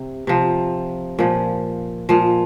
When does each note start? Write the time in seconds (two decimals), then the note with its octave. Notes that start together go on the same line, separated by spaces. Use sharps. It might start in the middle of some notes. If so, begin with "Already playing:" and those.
Already playing: C3
0.27 C3 F3
1.19 A#2 F3
2.09 A#2 F3